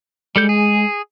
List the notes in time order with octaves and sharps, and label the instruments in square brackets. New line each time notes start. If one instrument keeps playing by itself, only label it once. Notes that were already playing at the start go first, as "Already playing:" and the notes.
[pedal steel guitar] G3 A4 G6 [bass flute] G#3
[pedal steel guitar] G#4